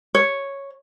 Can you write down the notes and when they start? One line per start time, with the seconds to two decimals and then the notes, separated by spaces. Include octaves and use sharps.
0.15 C#5